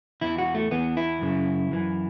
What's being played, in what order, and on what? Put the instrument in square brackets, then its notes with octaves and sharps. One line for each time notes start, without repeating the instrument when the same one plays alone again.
[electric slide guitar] E2 E3 E4
F#4
A3
E2 E3 B3
E4
F#2 C#3
F#2 E3